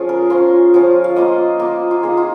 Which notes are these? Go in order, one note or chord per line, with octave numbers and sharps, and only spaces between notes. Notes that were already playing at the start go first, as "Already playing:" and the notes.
Already playing: F3 C#4 F4 G#4
A#4
F3 C#4 F4 A#4
F3 C#4 F4
F5
A#3 F4 D#5
A#3 F4
F4
A#3 D#4 G#4
F4